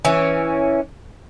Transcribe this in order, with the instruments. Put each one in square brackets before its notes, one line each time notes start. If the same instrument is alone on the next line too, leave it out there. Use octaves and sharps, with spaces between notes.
[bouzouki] E3 C#4